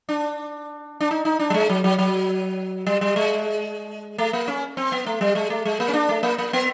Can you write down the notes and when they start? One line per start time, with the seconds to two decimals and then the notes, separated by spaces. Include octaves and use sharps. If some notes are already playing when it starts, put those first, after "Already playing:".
0.09 D4
1.00 D4
1.11 D#4
1.25 D#4
1.39 D4
1.50 G3
1.54 G#3
1.69 F#3
1.84 F#3
1.99 F#3
2.87 G3
3.01 G3
3.16 G#3
4.18 A3
4.33 A#3
4.48 C#4
4.77 C4
4.92 B3
5.06 A3
5.21 G3
5.35 G#3
5.50 A3
5.65 G#3
5.80 A#3
5.88 C#4
5.94 D4
6.09 A3
6.23 A#3
6.38 A#3
6.53 B3